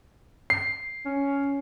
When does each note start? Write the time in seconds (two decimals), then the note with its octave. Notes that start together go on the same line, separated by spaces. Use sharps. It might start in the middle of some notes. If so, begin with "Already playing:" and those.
0.50 C7
1.06 C#4